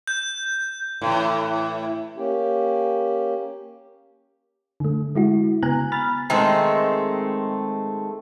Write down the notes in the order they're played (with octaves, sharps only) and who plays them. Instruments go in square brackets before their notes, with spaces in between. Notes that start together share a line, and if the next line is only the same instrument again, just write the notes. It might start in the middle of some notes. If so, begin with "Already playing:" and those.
[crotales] G6
[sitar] A2 E3
[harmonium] A#3 C#4 G4
[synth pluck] D3 A3
G#3 E4 F#4
C#3 B3 G#5 A#5 F#6
B5 F6 A6
[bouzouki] D#3 G#3 A3 C4